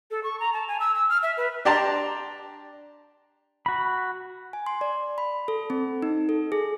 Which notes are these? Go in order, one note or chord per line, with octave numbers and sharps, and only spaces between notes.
A4
C#6
A#5
A5
G#5
E6
E6
F6
E5
B4
D4 G4 D5 A5 A#5 C6
F#4 B5
G#5
C6
D5
B5
A4
C4
D#4
A4
G#4